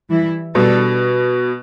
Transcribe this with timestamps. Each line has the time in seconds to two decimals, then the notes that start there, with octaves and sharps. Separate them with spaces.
0.10 E3 G3 E4
0.55 B2 G3 D4 A4